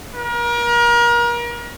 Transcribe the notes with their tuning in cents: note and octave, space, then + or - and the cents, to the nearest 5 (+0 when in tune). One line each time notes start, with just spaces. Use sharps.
A#4 +35